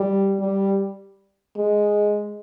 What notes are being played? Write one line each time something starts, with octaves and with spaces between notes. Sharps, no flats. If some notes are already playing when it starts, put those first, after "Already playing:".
Already playing: G3
G3
G#3